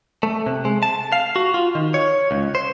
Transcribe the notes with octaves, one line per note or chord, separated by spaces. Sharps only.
A3
C3
G#3
A5
F5
F#4
F4
D#3
C#5
C#2
C5